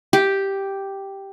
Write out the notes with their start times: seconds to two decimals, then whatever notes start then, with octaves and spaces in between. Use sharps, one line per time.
0.13 G4